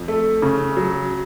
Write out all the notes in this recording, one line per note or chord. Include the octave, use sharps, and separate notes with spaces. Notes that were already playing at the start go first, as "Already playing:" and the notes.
Already playing: F2
A3
C#3
F#3